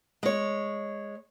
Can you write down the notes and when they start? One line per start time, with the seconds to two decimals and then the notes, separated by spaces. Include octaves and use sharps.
0.23 G#3 C#5